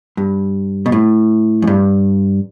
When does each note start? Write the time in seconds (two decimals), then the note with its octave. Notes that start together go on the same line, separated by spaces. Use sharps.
0.17 G2
0.86 B2
0.92 A2
1.62 F#2
1.67 G2